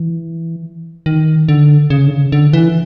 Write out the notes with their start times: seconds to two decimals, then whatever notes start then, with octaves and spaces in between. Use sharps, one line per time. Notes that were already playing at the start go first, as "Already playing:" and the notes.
Already playing: E3
1.06 D#3
1.49 D3
1.90 C#3
2.08 D3
2.11 C#3
2.32 D3
2.53 E3